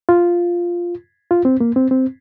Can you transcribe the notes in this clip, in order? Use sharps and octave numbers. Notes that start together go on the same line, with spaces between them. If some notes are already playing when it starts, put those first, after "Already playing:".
F4
F4
C4
A#3
C4
C4